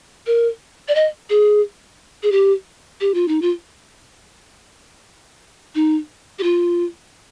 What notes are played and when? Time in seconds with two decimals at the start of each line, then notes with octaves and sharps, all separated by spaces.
0.27 A#4
0.88 D5
0.95 D#5
1.30 G#4
2.23 G#4
2.32 G4
3.01 G4
3.14 F4
3.28 D#4
3.42 F4
5.75 D#4
6.39 G4
6.43 F4